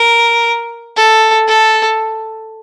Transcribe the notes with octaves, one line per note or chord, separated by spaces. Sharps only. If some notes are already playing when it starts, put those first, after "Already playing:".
Already playing: A#4
A4
A4